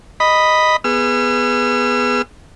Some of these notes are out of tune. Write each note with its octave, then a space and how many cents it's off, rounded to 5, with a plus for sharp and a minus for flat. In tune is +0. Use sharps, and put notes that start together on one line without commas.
D#5 +0 B5 +0
B3 +0 G#4 +0 E6 +45